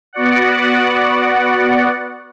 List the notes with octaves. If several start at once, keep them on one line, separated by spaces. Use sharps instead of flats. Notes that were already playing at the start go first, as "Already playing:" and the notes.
B3 F#4 D5 F#5